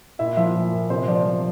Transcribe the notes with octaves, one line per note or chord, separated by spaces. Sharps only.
A#2 E4 E5
F3 E4 E5
A#2
A#2
C3 C5
F3 D5
F3